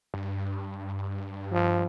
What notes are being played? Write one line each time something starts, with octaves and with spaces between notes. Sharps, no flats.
G2
F3